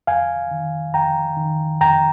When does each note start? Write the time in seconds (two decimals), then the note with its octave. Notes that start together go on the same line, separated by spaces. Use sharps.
0.07 F2 F5 G#5
0.51 D#3
0.94 F2 G5 A#5
1.37 D#3
1.81 F2 G5 A#5